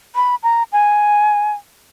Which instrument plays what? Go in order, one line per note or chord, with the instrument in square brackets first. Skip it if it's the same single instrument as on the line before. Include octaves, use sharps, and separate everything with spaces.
[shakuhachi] B5
A#5
G#5